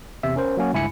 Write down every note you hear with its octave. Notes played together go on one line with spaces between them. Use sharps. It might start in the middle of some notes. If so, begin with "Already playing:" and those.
E2 C3 E5
C#4 A#4 C5
F#3 A#3 C#4 F#4
C#2 G2 E4 G#5 B5 C#7